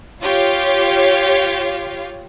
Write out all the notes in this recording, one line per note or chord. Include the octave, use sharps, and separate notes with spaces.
F4 G4 C#5 F5